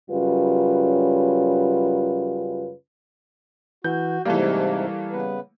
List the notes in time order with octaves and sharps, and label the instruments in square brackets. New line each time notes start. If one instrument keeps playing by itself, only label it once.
[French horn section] F#2 C#3 G3 F4 B4
[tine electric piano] E3 [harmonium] F#4 [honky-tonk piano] G6
[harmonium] G#2 C3 [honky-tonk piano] E3 A3 A#3 [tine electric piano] G3
[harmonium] C#3 B3 B4